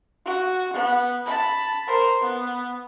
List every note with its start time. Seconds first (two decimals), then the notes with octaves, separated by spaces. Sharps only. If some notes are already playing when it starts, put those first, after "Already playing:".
0.25 F#4
0.73 B3
1.25 A5 B5
1.87 A#4 C5
2.21 B3